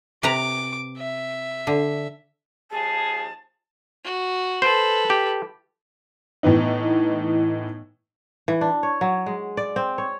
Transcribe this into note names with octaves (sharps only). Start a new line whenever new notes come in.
C3 B4 A#5 D6
E5
D3
D#2 F3 G#4 A5
F#4
A4 B4 C5
G4
A2 E3 B3 D#4
E3
D4
C#5
F#3
G#3
D5
C4
C#5